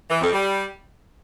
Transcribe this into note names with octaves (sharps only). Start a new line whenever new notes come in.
E3
F2
G3